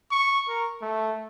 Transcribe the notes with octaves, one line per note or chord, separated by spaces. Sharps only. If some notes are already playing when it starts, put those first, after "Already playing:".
C#6
A#4
A3